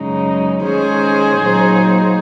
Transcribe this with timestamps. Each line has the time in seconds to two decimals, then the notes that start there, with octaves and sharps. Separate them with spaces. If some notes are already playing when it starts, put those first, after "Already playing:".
Already playing: F#2 C#3 G#3 D#4
0.64 D#3 G#3 C#4 G#4 C5
1.39 A#2 F#3 A#3 D#4